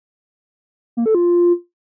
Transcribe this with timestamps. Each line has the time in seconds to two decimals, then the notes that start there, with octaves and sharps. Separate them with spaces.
0.97 A#3
1.06 A4
1.15 F4